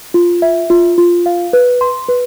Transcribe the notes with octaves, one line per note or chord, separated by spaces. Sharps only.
F4
E5
F4
F4
F5
B4
C6
B4